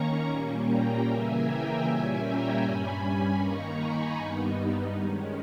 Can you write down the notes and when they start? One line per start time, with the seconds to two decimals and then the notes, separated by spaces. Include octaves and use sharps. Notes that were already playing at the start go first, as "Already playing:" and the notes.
Already playing: D#3 A#3 C#4 A#5 C#6
0.27 A#2 G3 A#3 C#4
0.65 G5 A#5
1.05 C#3 E3 A#3 E5 G#5
1.43 G5 A#5
1.82 A#2 G3 C#4 E5 G#5
2.21 G5 A#5
2.60 G2 G3 C#4 G#5 B5
3.38 D#3 A#3 D#4 A#5 C#6
3.77 G#5 B5
4.17 G2 G3 B3 D#4
4.94 D#3 G#3 C#4